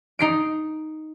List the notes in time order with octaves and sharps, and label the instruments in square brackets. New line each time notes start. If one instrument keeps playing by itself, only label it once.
[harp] D#4 C7 D7